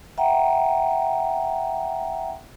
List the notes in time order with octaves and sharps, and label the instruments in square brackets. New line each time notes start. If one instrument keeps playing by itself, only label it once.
[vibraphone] E5 F#5 G5 A#5